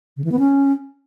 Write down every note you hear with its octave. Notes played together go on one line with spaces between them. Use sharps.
C#3
E3
B3
C#4